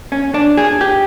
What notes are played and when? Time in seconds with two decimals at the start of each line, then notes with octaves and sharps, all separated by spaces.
0.12 C#4
0.34 D4
0.57 G#4
0.81 G4